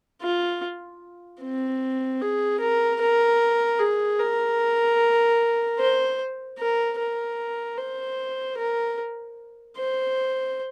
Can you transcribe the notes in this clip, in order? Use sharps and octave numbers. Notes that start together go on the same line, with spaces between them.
F4
C4
G#4
A#4
A#4
G#4
A#4
C5
A#4
A#4
C5
A#4
C5